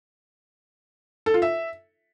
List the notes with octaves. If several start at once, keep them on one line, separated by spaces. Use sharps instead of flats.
A4
F4
E5